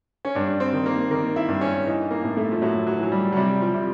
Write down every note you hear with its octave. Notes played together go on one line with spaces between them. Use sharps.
C#4
G2 D4
C4
D#3
A#3
D#3 A#3
E4
G2
C#4
E3 D#4
A#3
A2
A3
F3
A2 F#3
F#3
E3 F#3
G3
F#3
C3 G3
F3
C3